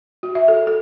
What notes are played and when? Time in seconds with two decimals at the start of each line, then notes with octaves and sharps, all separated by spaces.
0.23 F#4
0.35 E5
0.48 A4
0.67 A4